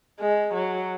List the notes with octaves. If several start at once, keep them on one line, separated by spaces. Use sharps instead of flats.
G#3
F#3